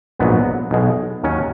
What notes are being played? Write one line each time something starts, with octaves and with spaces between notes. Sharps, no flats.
A#1 G#2 F#3 B3
B1 B2 G#3
D#2 D#3 F#3 C#4